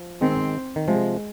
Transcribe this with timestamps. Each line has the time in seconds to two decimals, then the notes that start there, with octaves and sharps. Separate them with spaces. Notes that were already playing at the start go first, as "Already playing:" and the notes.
Already playing: F3
0.21 D#3 G#3 C4
0.76 D#3
0.87 C3 F3 G#3